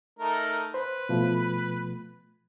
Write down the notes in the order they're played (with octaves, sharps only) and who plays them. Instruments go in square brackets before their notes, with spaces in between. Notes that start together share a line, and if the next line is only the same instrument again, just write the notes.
[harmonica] A3 D#4 A#4
[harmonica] B4 [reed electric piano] C5
[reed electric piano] B2 F3 A3